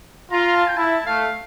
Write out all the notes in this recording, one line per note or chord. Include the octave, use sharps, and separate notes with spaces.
F4 A#5
A5
G5
E4 A5
A3 F5